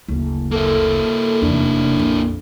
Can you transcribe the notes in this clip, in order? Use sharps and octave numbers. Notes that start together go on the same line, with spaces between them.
F#1 D2
A#3 E4 A4
F1 E2 D4
A#1 F2